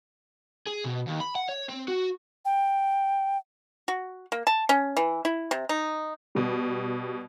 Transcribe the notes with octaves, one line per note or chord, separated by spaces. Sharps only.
G#4
B2
D#2
B5
F#5
C#5
C4
F#4
G5
F#4
A#3
A5
C#4
E3
E4
C3
D#4
B2 G3